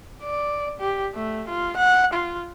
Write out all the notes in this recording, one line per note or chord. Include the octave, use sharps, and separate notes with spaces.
D5
G4
A3
F4
F#5
F4